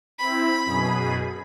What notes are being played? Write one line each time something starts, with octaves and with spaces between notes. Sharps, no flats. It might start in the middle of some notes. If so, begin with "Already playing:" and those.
C4 E4 B5
F#2 B2 G#4